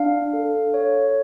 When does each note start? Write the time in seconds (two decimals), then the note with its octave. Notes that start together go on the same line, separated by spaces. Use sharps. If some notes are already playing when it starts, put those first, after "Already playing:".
Already playing: D4 F5
0.33 A4
0.74 C#5